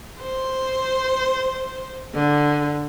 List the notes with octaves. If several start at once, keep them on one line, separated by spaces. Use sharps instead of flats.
C5
D3